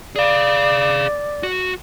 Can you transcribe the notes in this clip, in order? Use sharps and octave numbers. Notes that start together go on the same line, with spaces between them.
G#4 D5 F5
F#4